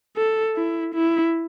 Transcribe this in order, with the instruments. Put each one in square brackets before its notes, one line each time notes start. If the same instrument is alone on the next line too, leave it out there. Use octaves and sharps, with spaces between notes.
[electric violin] A4
E4
E4